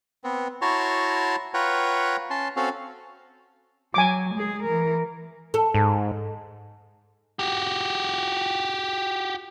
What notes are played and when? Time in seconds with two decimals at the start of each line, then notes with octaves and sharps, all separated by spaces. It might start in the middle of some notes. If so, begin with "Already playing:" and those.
0.24 B3 C4
0.62 E4 F#4 C#5 A5 A#5 C6
1.54 F4 B4 C#5 F#5 G5 A#5
2.30 C#4 A5 C6
2.57 C4 C#4 F#4 A4 F5
3.94 F#3 G#5 D6
4.34 G#3 G#4
4.63 E3 A#4
5.54 A4
5.74 G#2
7.39 F#4 G4